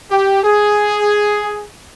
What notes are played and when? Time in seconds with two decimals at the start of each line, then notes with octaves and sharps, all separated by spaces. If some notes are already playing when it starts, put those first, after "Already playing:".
0.11 G4
0.44 G#4